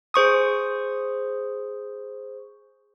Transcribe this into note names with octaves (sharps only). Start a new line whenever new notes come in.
G#4 C5 C#6 D#6